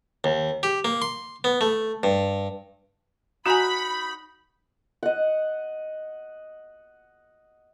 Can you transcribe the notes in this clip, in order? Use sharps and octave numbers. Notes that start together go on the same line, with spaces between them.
D#2
G4
A#3
C6
B3
A3
G2
D#4 F#4 F#5 G#5 B5 C#6
D#5 F#5